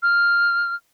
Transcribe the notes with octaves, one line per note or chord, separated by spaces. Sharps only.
F6